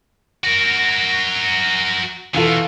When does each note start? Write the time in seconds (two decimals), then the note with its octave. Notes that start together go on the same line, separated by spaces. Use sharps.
0.44 F#4 A#4
2.34 B2 E3 F4 A4